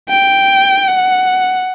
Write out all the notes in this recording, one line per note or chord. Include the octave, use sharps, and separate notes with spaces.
G5
F#5